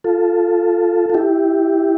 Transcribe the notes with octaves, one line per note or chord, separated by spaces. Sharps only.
F4 A4
F4
E4 G4